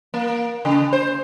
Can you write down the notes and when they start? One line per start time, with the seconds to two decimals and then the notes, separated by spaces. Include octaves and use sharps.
0.14 A#3
0.65 C#3
0.93 C5